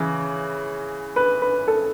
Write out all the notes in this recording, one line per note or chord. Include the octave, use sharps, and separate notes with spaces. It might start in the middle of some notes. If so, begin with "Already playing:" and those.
Already playing: C#3 E3
B4
B4
A4